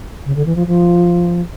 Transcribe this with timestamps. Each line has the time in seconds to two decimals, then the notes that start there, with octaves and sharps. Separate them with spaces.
0.25 C#3
0.35 D3
0.45 E3
0.55 F3
0.67 F3